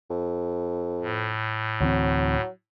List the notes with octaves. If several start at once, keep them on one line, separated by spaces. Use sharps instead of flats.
F2
A2
D2 E3 F#3 C4